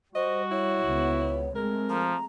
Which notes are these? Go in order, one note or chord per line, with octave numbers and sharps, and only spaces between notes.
G3 F#4 C5 D#5
E4 C#5
C#2 B3
G#3 A3 C4 A#4
F3 A#5